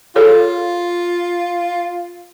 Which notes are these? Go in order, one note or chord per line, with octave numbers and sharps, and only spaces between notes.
F4 G#4 A4 C#5